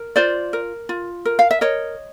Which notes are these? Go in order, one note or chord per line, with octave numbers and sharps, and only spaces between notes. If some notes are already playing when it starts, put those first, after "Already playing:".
Already playing: A#4
F4 C5 D5
A#4
F4
A#4
F5
E5
A#4 C#5 D#5